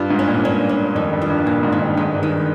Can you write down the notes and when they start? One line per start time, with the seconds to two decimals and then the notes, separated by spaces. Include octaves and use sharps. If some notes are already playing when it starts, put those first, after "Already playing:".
Already playing: G2 F4
0.10 G#2
0.19 C#4
0.27 A#2
0.45 G2 C#4
0.69 C#4
0.95 F2 D#3
1.13 G2
1.22 F4
1.30 G2
1.46 A#2 F4
1.63 G#2
1.72 D#3
1.81 G2
1.97 G#2 G#3
2.15 G2
2.23 D#3